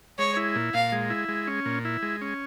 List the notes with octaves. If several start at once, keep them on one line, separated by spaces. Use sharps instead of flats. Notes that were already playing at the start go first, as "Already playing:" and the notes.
G#3 C#5
E4
A#2
A#2 F5
G#3
E4
G#3
C#4
A#2
E4
G#3
C#4